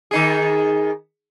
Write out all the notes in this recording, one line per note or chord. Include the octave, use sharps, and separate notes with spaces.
D#3 D#4 G#4